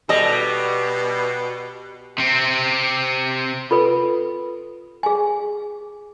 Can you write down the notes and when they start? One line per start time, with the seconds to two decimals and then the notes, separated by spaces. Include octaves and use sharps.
0.09 B2 G3 A4 D#5
2.18 C3 C4
3.71 F4 A4 B4
5.03 G#4 G#5